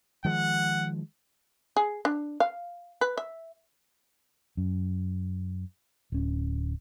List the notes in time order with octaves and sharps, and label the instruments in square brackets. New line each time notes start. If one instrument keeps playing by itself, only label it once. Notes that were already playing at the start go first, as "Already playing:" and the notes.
[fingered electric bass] D#3 F3 G#3 [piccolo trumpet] F#5
[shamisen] G#4
D4
F5
B4
E5
[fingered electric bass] F#2
D1 C#4